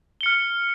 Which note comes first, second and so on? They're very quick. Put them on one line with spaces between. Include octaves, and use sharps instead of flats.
G7 C#7 F6